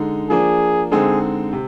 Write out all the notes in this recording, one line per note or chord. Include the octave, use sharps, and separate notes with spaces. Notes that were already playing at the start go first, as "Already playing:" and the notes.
Already playing: D3 G#3 D#4
F3 A#3 D4 G#4
D3 G#3 C4 D#4 G#4
C3